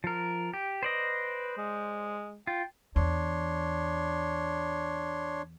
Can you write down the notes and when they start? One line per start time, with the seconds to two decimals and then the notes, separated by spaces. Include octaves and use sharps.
0.04 F3 A#4
0.53 G4
0.83 B4 C5 D5 D#5
1.57 G#3
2.47 F4 G5
2.96 E2 D4 C#5 C6